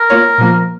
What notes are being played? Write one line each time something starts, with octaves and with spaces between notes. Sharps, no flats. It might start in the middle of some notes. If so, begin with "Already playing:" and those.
Already playing: A#4
A#3 F4 C#5
A#2 F3 A#3